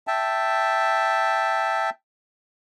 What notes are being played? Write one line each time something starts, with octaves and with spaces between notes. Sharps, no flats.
E5 G5 A5